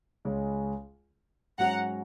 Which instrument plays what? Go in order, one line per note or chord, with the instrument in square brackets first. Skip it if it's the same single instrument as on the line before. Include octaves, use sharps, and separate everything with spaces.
[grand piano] C#2 C#3 G#3 C#4
[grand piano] G#2 F#3 C#4 [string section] F#5 A#5